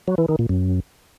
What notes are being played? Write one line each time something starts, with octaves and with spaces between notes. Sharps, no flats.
F#3
E3
D#3
A#2
F#2